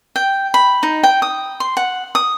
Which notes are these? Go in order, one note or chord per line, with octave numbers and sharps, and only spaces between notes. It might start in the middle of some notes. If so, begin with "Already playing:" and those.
G5
B5
D#4
G5
D#6
C6
F#5
D#6